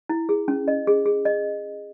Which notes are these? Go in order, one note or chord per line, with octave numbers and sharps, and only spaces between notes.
E4
G#4
C#4
D#5
G#4
G#4
D#5